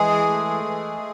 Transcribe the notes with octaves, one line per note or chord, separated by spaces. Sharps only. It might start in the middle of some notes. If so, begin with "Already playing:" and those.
Already playing: E3 G#3 G#4
A3
E3